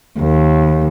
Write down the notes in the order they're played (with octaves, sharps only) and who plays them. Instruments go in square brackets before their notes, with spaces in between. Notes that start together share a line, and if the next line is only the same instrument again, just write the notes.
[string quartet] D#2